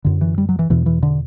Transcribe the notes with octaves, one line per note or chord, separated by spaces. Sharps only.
F#2 D3
E3
G3
F#3
E3
E2 B2 E3
E3
D3